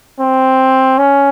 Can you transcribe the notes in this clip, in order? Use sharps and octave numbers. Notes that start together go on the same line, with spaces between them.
C4
C#4